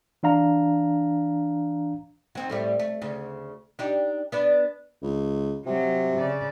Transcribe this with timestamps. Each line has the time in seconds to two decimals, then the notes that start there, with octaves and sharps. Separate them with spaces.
0.23 E3 D4 F5 A#5
2.35 F#3 C4 D#4
2.50 A2 G3 A3
2.79 A3
3.02 D2 C#3
3.79 D4 D#4 G4
4.32 B3 D4 D5
5.02 C#2
5.66 C3 F#3
6.17 C#3 D5